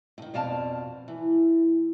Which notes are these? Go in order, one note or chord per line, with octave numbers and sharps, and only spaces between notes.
A2 D#3
F2 B2 D5 F5 A5
E3